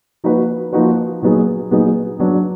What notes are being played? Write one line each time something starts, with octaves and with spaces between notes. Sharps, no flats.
F3 A#3 D#4 F#4 B4
F3 A#3 D#4 F#4 B4
A#2 F#3 B3 D#4 G#4
A#2 F#3 B3 D#4 G#4
F#3 B3 D4